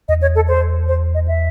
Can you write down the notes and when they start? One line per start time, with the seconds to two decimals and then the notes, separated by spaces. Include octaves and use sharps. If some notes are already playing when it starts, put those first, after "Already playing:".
0.08 E2 D#5
0.22 C#5
0.35 A4
0.48 C5
0.88 C5
1.14 D#5
1.28 E5